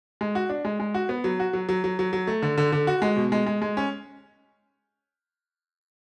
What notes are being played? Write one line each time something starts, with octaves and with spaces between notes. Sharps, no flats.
G#3
F#4
D4
G#3
G#3
F#4
B3
F#3
F#4
F#3
F#3
F#3
F#3
F#3
A3
D3
D3
D3
F#4
G#3
B2
G#3
G#3
G#3
C#4